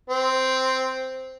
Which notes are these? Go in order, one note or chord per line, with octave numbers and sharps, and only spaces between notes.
C4